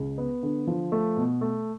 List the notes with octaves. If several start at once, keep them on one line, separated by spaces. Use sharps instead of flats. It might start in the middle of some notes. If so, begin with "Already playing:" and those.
Already playing: C#2
B3
D3
F3
A3
B2
A3